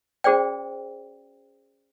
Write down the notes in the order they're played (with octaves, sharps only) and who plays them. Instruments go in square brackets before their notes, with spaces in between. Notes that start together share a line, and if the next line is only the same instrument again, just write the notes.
[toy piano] C#4 F#4 G#4 C5 D5 G5